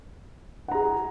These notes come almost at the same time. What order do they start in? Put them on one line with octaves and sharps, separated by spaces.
F#5 A#5 G#4